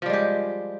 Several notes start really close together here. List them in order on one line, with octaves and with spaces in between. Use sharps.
F3 G3 G#3 G4